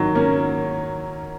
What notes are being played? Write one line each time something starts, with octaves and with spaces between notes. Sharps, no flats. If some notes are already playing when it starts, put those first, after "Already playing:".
Already playing: D#3 F#3
A#3 C#4